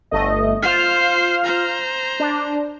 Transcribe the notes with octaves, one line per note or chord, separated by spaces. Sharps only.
G1 A3 D#5
F4 C5 F6 C7
C5 A#5
D4